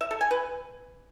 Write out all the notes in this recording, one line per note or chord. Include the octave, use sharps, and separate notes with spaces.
E5
A4
G#5
B4